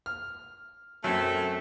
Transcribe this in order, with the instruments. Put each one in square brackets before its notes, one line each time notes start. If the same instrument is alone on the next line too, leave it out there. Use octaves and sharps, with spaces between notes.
[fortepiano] F6
[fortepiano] F#2 F#3 [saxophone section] A3 C4